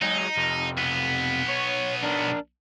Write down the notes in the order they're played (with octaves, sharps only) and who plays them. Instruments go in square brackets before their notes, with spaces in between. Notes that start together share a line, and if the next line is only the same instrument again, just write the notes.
[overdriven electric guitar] F#3 G#3 [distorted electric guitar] D#4
[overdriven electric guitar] F2 C3
[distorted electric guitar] B1 B3
[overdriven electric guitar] C#5
D4 A#4